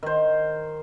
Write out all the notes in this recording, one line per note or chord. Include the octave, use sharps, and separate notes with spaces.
D#3 C5